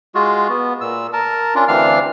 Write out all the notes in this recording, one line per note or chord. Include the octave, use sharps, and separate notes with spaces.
G#3 F4 F#4
B3
A#2 E6
A#4 A5
C#4 D4 F4
D2 E3 C4 D4 F5 F6